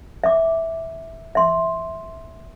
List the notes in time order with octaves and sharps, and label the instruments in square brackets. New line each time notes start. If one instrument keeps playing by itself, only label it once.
[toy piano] E5 D6
E5 C6